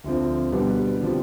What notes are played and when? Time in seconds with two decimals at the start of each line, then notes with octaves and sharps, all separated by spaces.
0.04 D2 D3 F3 C4
0.52 B2 G3 B3 D4 G4
1.01 D3 F3 C4 G4